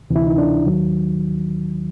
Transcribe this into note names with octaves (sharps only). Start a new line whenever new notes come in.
D2 C3 E3
E4
D#4
D4
D#2 D#3 F#3